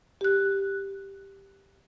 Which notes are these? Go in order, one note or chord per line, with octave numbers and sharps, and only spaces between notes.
G4 F#6